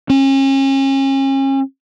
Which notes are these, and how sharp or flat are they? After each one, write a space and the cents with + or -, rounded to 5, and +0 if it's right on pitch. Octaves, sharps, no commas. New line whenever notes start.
C#4 -35